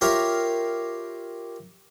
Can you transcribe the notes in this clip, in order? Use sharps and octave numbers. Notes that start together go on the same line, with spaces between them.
F4 G4 A#4 C#5 E5 F5